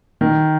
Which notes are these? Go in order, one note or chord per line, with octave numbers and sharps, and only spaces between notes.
D#3